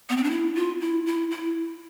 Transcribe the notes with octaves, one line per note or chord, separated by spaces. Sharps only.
B3
C4
D4
E4
F4
E4
E4
E4